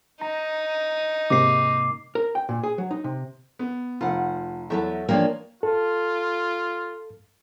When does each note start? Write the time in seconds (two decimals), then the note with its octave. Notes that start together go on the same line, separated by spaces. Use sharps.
0.21 D#4 A#5
1.30 G#2 C3 A#3 D6 C7
2.15 A#4
2.35 G5
2.49 A#2
2.63 G#4
2.78 F#3
2.91 D#4
3.04 C3
3.59 B3
4.01 F1 F4 F#5
4.70 E2 F#3 A4 E5
5.09 E3 F3 A#3 D4 F4 C#5 G5
5.63 F4 A4